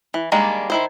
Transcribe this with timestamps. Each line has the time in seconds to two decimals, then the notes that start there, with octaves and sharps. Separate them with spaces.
0.14 E3
0.32 D#3 G3 G#3 A#3 D4
0.70 D#3 E4 C5